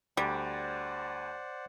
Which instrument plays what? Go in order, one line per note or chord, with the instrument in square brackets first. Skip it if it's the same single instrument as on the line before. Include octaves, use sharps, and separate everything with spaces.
[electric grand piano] D2 [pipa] G3 [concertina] C5 D5 F#5